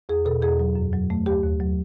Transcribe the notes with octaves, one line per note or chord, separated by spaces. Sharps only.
E2 G#4
B2 A4
E2 G#4
F#3
F#2
F#3
A3
D#2 G4
D#2
F#3